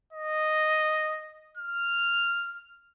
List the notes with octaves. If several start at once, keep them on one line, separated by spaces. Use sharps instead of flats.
D#5
F6